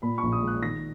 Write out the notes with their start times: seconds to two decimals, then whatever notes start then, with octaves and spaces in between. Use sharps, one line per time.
0.02 A#2 B5
0.18 C#6
0.23 A#1
0.32 D#6
0.42 G#3
0.47 F#6
0.63 D#3 A#6